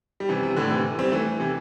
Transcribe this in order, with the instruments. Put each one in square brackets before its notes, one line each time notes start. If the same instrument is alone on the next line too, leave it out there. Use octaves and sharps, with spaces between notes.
[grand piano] G3
C3 E3
C3
A2 D3
C3 E3
G3 C4
E3 A3
C3 E3